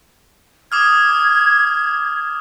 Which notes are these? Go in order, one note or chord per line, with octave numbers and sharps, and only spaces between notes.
D6 D#6 F6 G#6